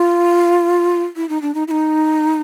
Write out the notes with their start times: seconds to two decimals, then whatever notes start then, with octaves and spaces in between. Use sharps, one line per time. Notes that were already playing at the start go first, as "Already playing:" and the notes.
Already playing: F4
1.16 E4
1.29 D#4
1.42 D4
1.55 D#4
1.68 E4
1.71 D#4